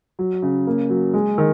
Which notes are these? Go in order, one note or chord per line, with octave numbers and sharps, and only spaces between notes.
F#3
C#3
A#3
F#3
G#3
D#3